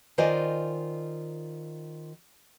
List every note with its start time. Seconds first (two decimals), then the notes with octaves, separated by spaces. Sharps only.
0.18 D#3 F4 C5 D5 D#5 G#5